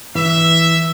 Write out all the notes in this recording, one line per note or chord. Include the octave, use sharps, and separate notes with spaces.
E3 E5